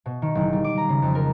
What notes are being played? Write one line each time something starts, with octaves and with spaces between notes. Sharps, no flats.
B2
D#3
F#1
G3
D6
A#5
C#3
F2
A#4